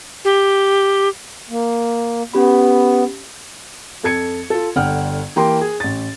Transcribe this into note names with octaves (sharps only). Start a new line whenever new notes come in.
G4
A#3
B3 C#4 G4 B5
F2 A4 G#6 C#7
F4 A4
G1 D3 F#5 G5 F6
E3 A#3 G4 A#4 G5 C6
G#4
A1 A6